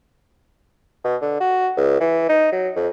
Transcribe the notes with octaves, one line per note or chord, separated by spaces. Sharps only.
B2
D3
F#4
C#2
E3
D#4
F#3
F2